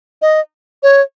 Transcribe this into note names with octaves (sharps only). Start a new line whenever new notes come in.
D#5
C#5